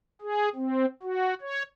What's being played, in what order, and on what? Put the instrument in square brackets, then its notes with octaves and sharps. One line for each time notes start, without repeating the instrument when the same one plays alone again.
[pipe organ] G#4
C4
F#4
C#5